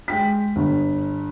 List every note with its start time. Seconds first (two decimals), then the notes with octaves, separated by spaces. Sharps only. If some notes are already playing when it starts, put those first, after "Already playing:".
0.08 G#3 G5 B6
0.56 G1